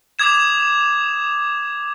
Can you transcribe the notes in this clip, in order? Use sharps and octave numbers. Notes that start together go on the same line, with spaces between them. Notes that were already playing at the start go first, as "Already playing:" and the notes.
D6 D#6 G#6 E7